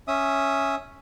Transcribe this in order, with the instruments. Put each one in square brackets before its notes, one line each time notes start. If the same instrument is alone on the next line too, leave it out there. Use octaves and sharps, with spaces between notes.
[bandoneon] C#4 E5 D#6